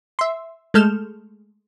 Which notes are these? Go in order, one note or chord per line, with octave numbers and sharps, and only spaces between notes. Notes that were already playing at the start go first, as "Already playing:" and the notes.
E5 C6
G#3 A3 A4 F6 G6 E7